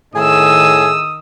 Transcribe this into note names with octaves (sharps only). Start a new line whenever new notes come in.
A2 D#3 G#4 D#6 E6